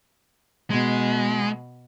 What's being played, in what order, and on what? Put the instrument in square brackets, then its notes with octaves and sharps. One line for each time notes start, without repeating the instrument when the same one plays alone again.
[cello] B2 [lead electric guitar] G#3